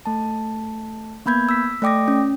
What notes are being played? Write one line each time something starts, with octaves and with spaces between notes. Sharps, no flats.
A3 A5
A#3 B3 B5 G6 G#6
E6 B6
A3 D5 G5 D6 D#6 A#6
C#4